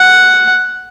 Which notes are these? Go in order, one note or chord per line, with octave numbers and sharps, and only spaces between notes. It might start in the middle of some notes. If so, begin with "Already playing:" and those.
Already playing: F#5